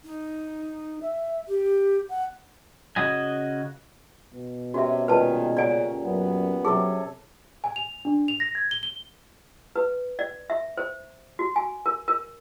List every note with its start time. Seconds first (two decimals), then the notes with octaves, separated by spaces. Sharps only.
0.05 D#4
1.01 E5
1.48 G4
2.10 F#5
2.96 C#3 F#4 D#5 G#5
4.34 B2
4.74 C3 C#4 F#4 E5
5.08 A#2 D#3 G#3 G4 B4 A5
5.57 C#3 G4 D5 F#5 G#5
6.05 F#2 B3
6.65 C3 F#3 C#4 G#4 A4
7.64 G#5
7.76 F7
8.05 D4
8.28 F7
8.40 A#6
8.55 G#6
8.71 G7
8.83 G7
9.76 B4
10.19 D5
10.50 E5
10.77 C5
11.39 F#4
11.56 G#5
11.86 A#4
12.08 A#4